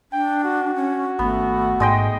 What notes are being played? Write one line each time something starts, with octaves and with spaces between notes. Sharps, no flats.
D4 G5
F#4
C#4
G#1 A3 B3
G#2 G#3 D#5 G5